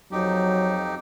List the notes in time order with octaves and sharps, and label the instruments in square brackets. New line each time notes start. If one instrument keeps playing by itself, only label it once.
[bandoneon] F2 D#4 G4 [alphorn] F#3